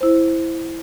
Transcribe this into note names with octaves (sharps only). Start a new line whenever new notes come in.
E4 C5